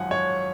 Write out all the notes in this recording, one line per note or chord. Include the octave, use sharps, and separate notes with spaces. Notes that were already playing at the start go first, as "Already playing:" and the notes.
Already playing: G#1 F#2 F3 F#5 G#5
C#5